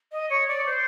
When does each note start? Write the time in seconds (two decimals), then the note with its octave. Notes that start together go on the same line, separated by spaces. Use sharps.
0.12 D#5
0.30 C#5
0.48 D5
0.66 C5